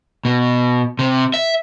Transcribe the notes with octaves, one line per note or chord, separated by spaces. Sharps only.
B2
C3
E5